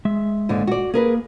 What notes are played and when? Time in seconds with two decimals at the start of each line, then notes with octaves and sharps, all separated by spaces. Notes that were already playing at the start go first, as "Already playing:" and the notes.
0.05 G#3 E5
0.49 D#2 G#2 D3
0.67 F#4 D5
0.94 A#3 G#4 A#4 B4